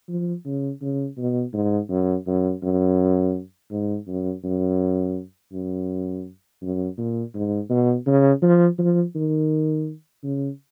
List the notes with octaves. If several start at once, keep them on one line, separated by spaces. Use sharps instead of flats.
F3
C#3
C#3
B2
G#2
F#2
F#2
F#2
G#2
F#2
F#2
F#2
F#2
A#2
G#2
B2
C#3
F3
F3
D#3
C#3